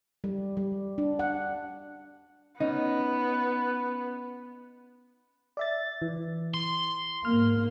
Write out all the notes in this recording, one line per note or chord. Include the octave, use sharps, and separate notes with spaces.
G3
G3
D4
F#5
B3 C#4 D#4
D5 E5 A6
E3
C6
G#2 A#3 F6